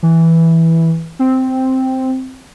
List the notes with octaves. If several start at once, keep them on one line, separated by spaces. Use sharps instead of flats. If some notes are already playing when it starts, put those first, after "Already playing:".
E3
C4